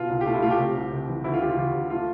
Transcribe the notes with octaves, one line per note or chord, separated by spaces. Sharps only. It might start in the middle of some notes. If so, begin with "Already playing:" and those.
Already playing: B2 F4
C2
G4
A3 F4
E4
A3 F4
G4
C3
C2
C3
E3
D2 E4
F4
E3 G4
F4
E3 G4
D2
A3 F4